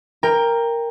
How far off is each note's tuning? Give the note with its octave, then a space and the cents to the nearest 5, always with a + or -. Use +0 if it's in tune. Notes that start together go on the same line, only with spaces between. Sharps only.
A#4 +0 G5 +20